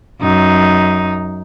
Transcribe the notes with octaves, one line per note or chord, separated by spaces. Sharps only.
F#2 D#4